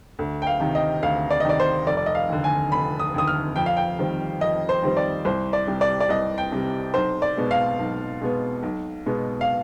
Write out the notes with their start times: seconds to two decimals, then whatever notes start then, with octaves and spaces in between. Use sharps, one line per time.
0.19 D2
0.42 G5
0.47 F5
0.60 C3 D#3
0.75 D#5
1.03 D2 F5
1.31 D5
1.40 D#5
1.45 C3 D#3 D5
1.60 C5
1.87 F1 D5
1.97 D5
2.06 D#5
2.15 F5
2.29 D#2 D3
2.44 G#5
2.71 F1 B5
2.99 D#6
3.14 D#2 D3 D#6
3.28 F6
3.56 F2 G5
3.66 F5
3.77 G5
3.98 D#3 G3 C4
4.41 F2 D#5
4.69 C5
4.82 D#3 G3 C4
4.97 D5
5.25 C2 C5
5.53 D5
5.67 C3 G3
5.81 D5
6.00 D5
6.09 C2 D#5
6.38 G5
6.52 C3 G3
6.94 B1 C5
7.22 D5
7.37 B2 G#3 B3
7.51 F5
7.79 B1
8.21 B2 G#3 B3
8.63 B1
9.06 B2 G#3 B3
9.41 F5